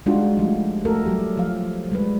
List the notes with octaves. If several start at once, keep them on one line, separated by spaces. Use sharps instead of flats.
G3 G#3 D4 D#4 F4 F#4
F3 G3 A3
A3 F#4 A4 A#4
F#3 G3 G4
F3 F5
G3 G#3 B4